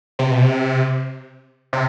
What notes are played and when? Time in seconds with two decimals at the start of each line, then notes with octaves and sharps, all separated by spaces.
0.19 C3
0.31 B2
0.42 C3
1.73 C3